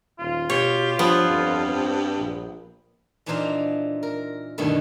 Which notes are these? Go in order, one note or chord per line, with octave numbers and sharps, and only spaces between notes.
D#1 F4
B2 G4 C#5
G2 F3 B3
F2
C4
A#1
A#2 E3 D4 D#4 C5 F5
A#4
G2 B2 D3 D#3 A3 E4